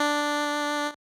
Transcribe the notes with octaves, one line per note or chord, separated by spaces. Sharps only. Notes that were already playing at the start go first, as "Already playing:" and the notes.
Already playing: D4